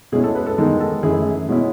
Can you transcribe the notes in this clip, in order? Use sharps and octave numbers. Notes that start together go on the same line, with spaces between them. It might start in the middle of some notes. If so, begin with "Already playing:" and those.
B2 G#3 C#4 E4 G#4
A4
B4
A4
E2 D#3 G#3 D#4 A4
A4
F#2 E3 A3 E4 G#4
B2 G#3 C#4 E4